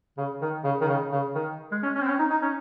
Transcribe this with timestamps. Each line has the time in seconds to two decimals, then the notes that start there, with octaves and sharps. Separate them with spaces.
0.18 C#3
0.41 D#3
0.64 C#3
0.81 D#3
0.88 C#3
1.12 C#3
1.35 D#3
1.72 G#3
1.83 C#4
1.95 C#4
2.01 C4
2.07 C#4
2.19 D#4
2.30 D#4
2.42 C#4